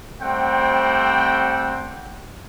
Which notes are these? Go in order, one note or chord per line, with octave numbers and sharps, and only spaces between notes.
G3 A3 C4 C5 F#5 G5